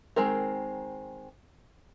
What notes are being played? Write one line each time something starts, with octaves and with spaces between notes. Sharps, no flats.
D#3 G#3 C4 A#4